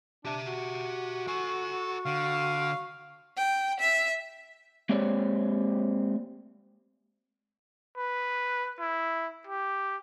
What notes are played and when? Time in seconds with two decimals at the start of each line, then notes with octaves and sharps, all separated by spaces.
0.25 D4 G4 E5
0.45 F#4
1.27 A4 G#5 C#6
2.05 D3 F5
3.37 G5
3.80 E5
4.89 G#3 A#3 C4 G4 C#5 D5
7.98 B4
8.80 E4
9.47 G4